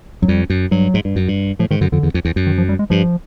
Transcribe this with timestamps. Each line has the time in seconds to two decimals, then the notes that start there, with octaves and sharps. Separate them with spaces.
0.22 F#2 F#3
0.28 F2 G3
0.50 F#2
0.71 G2 F#3
0.94 G#2
1.05 G2
1.16 F#2
1.28 G2
1.59 A2 F3
1.71 G#2 D#3
1.81 F#2 D3
1.92 F2 D3
2.03 E2
2.14 F2
2.25 E2
2.36 F#2
2.47 D#3
2.58 F3
2.69 G3
2.79 G#3
2.90 G2 F3